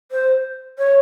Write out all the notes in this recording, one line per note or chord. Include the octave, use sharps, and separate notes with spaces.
C5
C#5